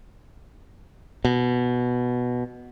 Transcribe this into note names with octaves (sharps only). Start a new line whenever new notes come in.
B2